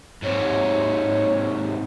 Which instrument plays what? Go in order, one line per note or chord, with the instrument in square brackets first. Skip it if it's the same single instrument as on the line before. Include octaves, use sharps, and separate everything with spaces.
[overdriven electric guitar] G#2 C3 [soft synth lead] C#5